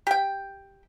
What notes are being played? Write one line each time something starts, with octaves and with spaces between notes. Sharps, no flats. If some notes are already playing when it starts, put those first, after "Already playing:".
G4 G5